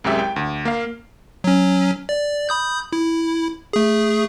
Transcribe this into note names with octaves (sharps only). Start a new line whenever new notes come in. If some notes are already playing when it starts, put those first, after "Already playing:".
C2 F#2 G#3 G4 E5
G5
D2
A#3 F5
F#3 C#4
D5
B5 D#6 G6
E4
A3 G#4